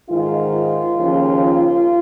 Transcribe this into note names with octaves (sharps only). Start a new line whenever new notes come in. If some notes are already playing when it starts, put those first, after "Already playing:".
G#2 D#3 F4
D#2 C#3 F3